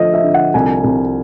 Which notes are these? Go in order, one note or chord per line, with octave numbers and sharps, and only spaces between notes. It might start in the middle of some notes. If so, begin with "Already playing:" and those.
Already playing: D3 F3 A3 D#5 E5
E5
D3
F#5
C2 G#5
C2